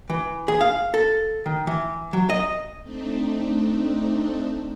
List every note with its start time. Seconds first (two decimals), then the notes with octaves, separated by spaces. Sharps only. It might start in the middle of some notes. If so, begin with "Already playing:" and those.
0.10 E3
0.48 G#4
0.61 F5
0.94 A4
1.46 D#3
1.67 E3
2.13 F#3
2.30 D#5
2.83 A3 C4 D4 D#4